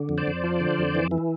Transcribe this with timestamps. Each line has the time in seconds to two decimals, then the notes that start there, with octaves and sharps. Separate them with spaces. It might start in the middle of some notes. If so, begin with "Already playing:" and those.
Already playing: D3
0.09 F2
0.18 C5 D5
0.27 F2
0.44 F3
0.60 D3
0.78 F2
0.95 E3
1.11 E3